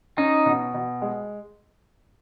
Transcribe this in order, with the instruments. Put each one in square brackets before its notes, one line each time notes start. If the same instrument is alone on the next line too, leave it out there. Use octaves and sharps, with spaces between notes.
[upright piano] C#4 [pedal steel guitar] D#4
[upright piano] B2
B2
G#3